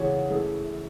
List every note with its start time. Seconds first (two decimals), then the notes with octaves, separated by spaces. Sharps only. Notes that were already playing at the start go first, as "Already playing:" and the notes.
Already playing: E2 C#3 E3 A3 F#4 G#4 C#5
0.30 F#2 E3 A3 G#4